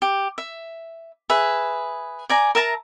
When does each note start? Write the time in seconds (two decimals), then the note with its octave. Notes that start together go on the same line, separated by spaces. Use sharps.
0.02 G4
0.38 E5
1.30 G#4 B4 E5
2.30 D5 G#5 A#5
2.55 A#4 E5 A5 A#5